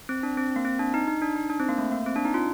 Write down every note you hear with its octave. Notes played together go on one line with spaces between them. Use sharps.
C4
D4
C4
A#3
C4
D4
D#4
D#4
D4
D#4
D4
C4
A#3
A3
A#3
C4
D4
D#4
F4